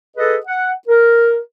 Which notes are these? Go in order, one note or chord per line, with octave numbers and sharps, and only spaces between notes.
G#4 A4 B4 D#5
F#5
A#4